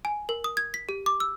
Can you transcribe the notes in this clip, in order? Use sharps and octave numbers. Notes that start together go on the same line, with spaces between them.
G#5
A#4
D#6
G#6
B6
G4
D6
E6